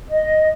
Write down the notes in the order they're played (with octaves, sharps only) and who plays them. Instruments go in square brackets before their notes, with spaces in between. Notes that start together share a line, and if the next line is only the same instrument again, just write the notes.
[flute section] D#5